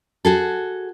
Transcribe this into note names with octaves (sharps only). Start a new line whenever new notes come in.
F#4 G#4 A4